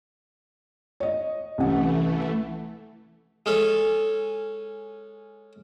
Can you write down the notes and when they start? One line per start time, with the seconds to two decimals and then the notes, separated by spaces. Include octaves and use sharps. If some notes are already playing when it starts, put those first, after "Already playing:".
1.00 C#5 D#5
1.58 C2 E3 A3 C#4 F#5
3.46 G#3 C#4 A4